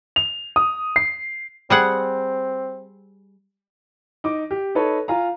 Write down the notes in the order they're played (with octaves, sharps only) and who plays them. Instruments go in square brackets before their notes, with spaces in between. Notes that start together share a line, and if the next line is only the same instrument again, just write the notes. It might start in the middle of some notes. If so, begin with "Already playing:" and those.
[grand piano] F7
D#6
C7
[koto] G3 G#4 F#5 [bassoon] C4
[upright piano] D#4 D6
G4
D#4 A4 B4 C#5
F4 F5 G#5 A#5